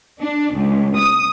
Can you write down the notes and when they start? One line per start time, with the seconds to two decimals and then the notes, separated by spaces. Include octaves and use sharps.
0.21 D4
0.55 C#2
0.97 D#6